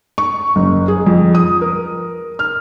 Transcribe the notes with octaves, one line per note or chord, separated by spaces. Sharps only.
C#6
F#1
G#4
F2
D#6
A#4
F6